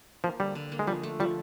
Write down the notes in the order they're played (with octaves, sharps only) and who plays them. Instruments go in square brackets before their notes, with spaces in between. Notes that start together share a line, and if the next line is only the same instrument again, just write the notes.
[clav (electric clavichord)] F3 [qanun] A#3
[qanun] D3 [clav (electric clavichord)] G3
[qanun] D3
A#3
[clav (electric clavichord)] G#3
[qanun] F3 [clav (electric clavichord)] G3
[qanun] A3
[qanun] F3 [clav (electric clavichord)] G3